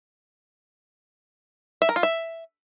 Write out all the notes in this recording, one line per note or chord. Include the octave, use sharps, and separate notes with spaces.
E5
A#4
F4
E5